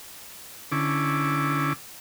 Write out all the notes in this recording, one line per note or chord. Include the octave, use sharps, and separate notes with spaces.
D3 C#4 E4 D6